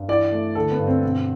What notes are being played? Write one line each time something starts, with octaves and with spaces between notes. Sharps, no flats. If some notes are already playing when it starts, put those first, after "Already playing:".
Already playing: G2
E3 D5
A3
D3 A4
B3
G2
C4
B2